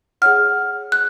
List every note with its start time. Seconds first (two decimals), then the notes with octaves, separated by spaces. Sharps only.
0.22 G#4 C#5 F#5 F6
0.92 F#6